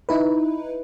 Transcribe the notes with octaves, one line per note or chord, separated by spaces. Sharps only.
D#4 E4 B4